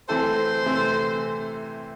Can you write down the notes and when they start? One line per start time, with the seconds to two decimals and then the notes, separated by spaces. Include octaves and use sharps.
0.09 E3 A3 C4 E4 A4 C5
0.66 C3 E3 A3 C4